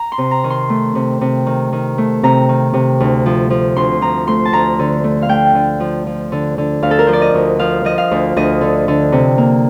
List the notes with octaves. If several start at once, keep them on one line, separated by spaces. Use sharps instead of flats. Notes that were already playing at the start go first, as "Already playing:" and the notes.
Already playing: A#5
C6
C3
A#5
D#3
C6
A3
C3
C3
D#3
D#3
A3
C3 A#5
D#3
C3
D2
F3
F3
D2 C6
F3 A#5
A3 C6
A5
D2 A#5
D3
A3
F5
A3 G5
D3
F3
F3
D3
D3
D2 F5
A4
A#4
F3 C5
D5
D#5
D2
F3 F5
F3 D#5
F5
D2
D2 D#5
D3
D3
C3
A#3